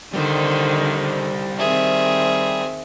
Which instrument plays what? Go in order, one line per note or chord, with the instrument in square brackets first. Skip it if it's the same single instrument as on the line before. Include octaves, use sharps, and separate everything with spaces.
[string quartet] D3 D#3 [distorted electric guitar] G3 C5
[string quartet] D#3 C4 [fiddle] G#4 E5